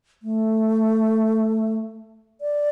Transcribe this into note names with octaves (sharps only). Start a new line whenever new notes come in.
A3
D5